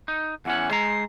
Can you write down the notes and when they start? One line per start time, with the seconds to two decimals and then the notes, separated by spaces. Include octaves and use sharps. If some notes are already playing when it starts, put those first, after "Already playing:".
0.08 D#4
0.45 E2 E3 C#4 F#5
0.71 G#3 A#5 C7